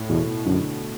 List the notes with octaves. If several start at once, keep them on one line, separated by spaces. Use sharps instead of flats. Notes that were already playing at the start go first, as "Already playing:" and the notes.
Already playing: A2
E2 B2
F#2 D3